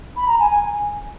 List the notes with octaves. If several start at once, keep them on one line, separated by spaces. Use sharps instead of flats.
B5
A#5
G#5
G#5